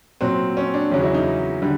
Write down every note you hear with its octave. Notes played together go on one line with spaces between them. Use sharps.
A#2 F#3 C4
C#4
D4
E2 C#3 F#3 C#4
E4
D#4
D3 G3